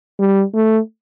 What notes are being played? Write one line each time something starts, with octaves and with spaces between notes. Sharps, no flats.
G3
A3